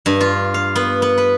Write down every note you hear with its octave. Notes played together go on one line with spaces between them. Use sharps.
G2
F4
F5
B3
B3
B4